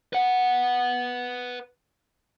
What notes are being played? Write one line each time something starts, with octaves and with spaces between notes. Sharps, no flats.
B4 F#5